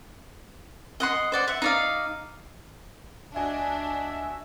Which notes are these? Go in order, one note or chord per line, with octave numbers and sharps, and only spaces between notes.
D#5 F#5 C6
C5 D5 F#5
E5 F#5
D#4 D5 F5
C#2 D4 F#4 D#5 E5 G#5